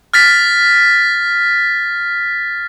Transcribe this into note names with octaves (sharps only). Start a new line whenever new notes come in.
F6 A6 B6